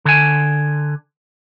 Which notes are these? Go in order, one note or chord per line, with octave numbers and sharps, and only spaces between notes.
D3 G#5